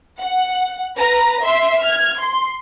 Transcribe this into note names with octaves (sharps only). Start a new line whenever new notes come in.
F#5
B4 A#5
E5 C6 C7
F6 G#6
C6